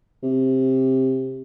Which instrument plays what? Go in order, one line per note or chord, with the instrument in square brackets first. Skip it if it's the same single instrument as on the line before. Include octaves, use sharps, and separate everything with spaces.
[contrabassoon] C3